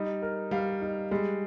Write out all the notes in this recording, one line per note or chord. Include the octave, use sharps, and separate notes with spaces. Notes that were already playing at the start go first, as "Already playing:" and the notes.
Already playing: G3 D#4
A#4
G3 F5
D#4
G3 G#3